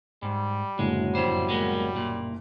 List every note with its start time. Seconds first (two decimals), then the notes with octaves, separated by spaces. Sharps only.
0.22 G#2 G3
0.79 F#1 A2 D3 F#3 G#3
1.15 F2 G3 E4 C5
1.49 G#3 A#3 B3
1.96 A#2